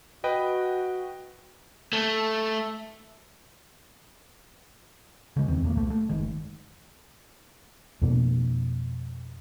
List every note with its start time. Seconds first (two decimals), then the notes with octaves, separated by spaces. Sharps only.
0.24 F#4 B4 D#5 G5
1.93 A3
5.36 C#3 G#3
5.48 D#1 E2 D#3 C4
5.64 E1 A#2 A3 A#3
5.76 C2 A3
5.90 A3
6.09 F#1 D#3 G#3
8.02 F2 B2 A#3